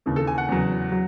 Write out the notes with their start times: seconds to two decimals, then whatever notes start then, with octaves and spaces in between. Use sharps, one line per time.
0.06 D#2 C#3 E3
0.16 A4
0.27 G#5
0.38 F#5
0.49 E2 C#3 F#3
0.92 F#3